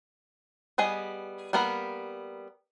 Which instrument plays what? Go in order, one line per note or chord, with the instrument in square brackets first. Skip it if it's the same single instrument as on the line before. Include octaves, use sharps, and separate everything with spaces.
[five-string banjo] G3 B3 G#4 D#5
G3 A#3 B3 A#4 B5